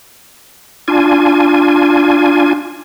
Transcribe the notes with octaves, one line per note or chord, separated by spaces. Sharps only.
D4 F4 G#5